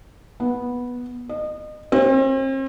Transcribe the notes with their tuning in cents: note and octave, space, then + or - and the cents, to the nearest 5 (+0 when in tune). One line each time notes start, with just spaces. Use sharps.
B3 -10
D#5 -30
C4 +40